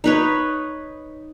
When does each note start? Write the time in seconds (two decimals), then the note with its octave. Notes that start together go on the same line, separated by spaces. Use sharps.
0.04 D#4 B4 C#5